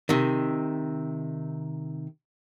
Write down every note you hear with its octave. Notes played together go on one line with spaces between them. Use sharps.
C3 D#3